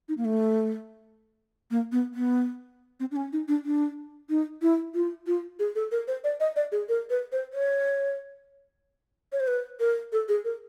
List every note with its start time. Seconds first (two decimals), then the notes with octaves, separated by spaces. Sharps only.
0.09 D#4
0.18 A#3
0.25 A3
1.71 A#3
1.92 B3
2.14 B3
3.00 C4
3.11 D4
3.16 C#4
3.33 D#4
3.48 D4
3.65 D4
4.29 D#4
4.62 E4
4.94 F4
5.27 F4
5.59 G#4
5.75 A4
5.92 A#4
6.08 C5
6.24 D5
6.40 D#5
6.56 D5
6.72 G#4
6.89 A#4
7.10 B4
7.32 C5
7.53 C#5
9.32 C#5
9.40 C5
9.47 B4
9.80 A#4
10.12 A4
10.28 G#4
10.45 A#4